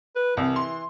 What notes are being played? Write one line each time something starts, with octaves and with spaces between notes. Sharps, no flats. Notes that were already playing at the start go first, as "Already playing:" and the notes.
B4
C2 E3
C6